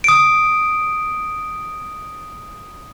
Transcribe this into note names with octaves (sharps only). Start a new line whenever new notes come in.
D#6 D7